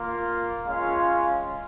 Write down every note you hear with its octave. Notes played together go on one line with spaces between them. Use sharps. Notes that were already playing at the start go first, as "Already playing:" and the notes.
Already playing: A#3 F4
G#3 C#4 F4 F5